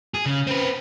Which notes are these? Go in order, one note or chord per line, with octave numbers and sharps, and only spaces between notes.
G#4
C#3
C4 B4